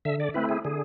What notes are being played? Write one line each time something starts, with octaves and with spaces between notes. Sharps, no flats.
D3 E5
D5
A3 C4 E4 B4
G#4
D3 G#4